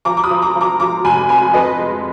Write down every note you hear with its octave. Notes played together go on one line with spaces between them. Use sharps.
F3 A#5 D6
D6
B5 D#6
F3
A#5 D6
F3
A#5 D6
F3 A#5 D6
F1 G#5 B5
F2 G#5 B5
F2 B4 D#5
G#3